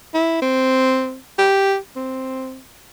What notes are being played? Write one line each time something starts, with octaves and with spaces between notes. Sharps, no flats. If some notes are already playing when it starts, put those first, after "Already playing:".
E4
C4
G4
C4